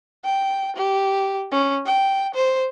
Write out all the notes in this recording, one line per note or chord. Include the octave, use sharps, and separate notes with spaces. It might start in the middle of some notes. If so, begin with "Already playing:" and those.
G5
G4
C#4
G5
C5